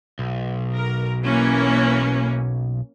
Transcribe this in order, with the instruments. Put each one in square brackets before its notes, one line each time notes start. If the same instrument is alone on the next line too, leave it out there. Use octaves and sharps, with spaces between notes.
[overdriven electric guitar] B1
[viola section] A#4
E3 A#3 C#4